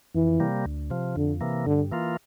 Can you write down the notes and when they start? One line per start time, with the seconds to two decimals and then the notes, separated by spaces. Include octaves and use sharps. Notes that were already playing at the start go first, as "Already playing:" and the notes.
0.14 F2 E3
0.40 C3 G3 A#3
0.65 D2
0.90 C3 F3
1.16 F2 D3
1.41 C3 E3 A#3
1.66 G2 D3
1.92 E3 A#3 F4